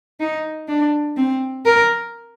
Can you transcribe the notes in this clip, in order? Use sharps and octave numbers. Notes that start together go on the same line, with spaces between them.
D#4
D4
C4
A#4